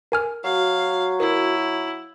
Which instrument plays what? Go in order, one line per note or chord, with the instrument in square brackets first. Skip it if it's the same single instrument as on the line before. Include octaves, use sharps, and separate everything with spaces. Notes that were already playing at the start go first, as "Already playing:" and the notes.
[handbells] A#4 G#5 F6
[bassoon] F#3 [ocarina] F#4 [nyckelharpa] F5
[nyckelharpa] E4 [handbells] A#4